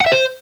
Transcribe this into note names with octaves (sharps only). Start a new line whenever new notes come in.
F#5
E5
C5